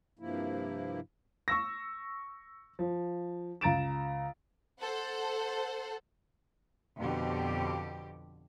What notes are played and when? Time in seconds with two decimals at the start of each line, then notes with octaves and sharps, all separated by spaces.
0.19 G2 C3 F3 A#3 E4
1.48 C#6 E6 A#6
2.79 F3
3.61 C#2 A#5 A6 D7 E7
4.81 A4 C5 F#5
7.00 F2 B2 D3 G4